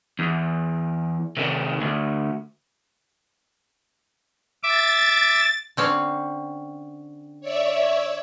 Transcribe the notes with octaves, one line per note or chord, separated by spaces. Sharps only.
E2
C3 D#3
D2
E5 D6 A6
D3 C4 C#4
C#5 D5 E5